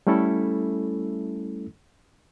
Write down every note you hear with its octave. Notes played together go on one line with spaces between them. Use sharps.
G3 A3 C#4 E4 A4